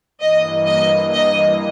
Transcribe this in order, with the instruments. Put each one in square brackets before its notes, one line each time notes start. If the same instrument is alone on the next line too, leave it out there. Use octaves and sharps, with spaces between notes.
[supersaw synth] G2 E3 A#3 [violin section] D#5
[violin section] D#5
D#5